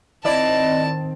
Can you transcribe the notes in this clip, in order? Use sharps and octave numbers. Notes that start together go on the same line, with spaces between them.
D#3 C4 E4 D5 D#5 A5